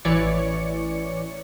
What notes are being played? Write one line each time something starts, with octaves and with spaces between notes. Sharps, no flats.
A1 E3 C#5 D5 C#7